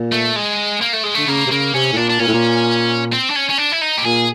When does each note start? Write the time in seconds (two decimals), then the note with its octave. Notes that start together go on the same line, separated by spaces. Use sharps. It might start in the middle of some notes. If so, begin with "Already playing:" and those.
Already playing: A#2
0.12 A3
0.36 G#3
0.81 A#3
0.93 A3
1.04 G#3
1.15 D3 A3
1.27 C#3 A#3
1.47 C3
1.50 C#3 A#3
1.74 C3 C#4
1.92 A2
1.97 A#2 D4
2.10 D4
2.20 A#2 C#4
2.28 A2
2.34 A#2
3.13 C4
3.31 D4
3.36 C#4
3.50 C#4
3.58 D4
3.72 E4
3.82 D#4
3.98 G4
4.05 A#2 G#4